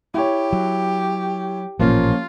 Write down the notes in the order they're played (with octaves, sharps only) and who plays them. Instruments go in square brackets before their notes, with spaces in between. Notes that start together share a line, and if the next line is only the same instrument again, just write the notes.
[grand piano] E4 C#5 [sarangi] G4
[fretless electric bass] F#3
[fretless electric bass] A1 A#2 [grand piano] F3 A#3 C#4 [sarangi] F4